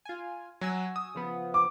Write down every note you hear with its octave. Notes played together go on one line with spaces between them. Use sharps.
F4 G#5
F#3 F#4 G#5 E6
D#6
C#3 F3 B3
D6